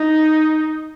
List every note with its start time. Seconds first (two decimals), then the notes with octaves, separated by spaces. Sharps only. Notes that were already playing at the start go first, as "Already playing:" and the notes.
Already playing: D#4